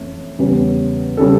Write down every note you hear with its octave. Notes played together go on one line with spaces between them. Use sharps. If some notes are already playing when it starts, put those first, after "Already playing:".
Already playing: F2 E3 A3 C#4
E2 C#3 G3 C#4
C#3 G3 C#4 A4